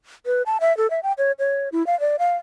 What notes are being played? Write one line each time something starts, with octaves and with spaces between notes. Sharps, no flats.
B4
A5
E5
A4
E5
G5
C#5
C#5
E4
F5
D5
F5